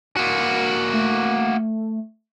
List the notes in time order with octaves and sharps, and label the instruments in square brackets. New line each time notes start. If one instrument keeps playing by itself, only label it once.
[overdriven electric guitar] A#3 F#4
[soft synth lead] A3